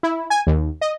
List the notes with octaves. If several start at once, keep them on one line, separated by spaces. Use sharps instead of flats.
E4
G#5
D#2
D#5